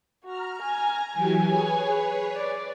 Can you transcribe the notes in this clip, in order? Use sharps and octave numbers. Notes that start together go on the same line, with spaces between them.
F#4 A#5 F6
G#5
E3 F#3 G4 G#5
G#4 B4 C#5
D5